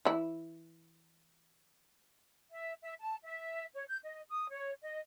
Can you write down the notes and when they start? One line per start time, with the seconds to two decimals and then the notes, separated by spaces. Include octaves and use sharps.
0.05 E3 E4
2.52 E5
2.82 E5
3.01 A5
3.23 E5
3.74 C#5
3.88 G6
4.04 D#5
4.30 D#6
4.51 C#5
4.82 D#5